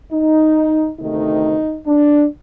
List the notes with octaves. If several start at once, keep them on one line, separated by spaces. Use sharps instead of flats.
D#4
D2 C3 D#3 A3 D#4
D4